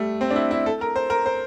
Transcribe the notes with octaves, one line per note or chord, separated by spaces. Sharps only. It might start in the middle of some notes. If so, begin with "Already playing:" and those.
Already playing: G3 A3
C4
D4
E4
E4
A4
A#4
C5
A#4
C5